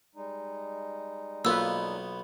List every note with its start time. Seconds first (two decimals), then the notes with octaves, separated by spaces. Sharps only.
0.15 G3 G#3 D#4
1.45 B1 A#3 B3 F4 B4 E6